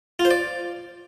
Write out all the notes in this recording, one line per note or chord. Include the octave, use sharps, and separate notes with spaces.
F4
C5
D5